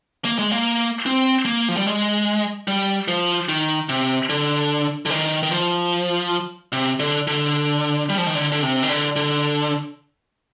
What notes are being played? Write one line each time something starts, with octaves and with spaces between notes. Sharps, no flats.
A#3
G#3
A#3
C4
A#3
F3
G3
G#3
G3
F3
D#3
C3
D3
D3
D#3
D#3
F3
C3
D3
D3
G3
F3
D#3
D3
D3
C3
D#3
D3
D3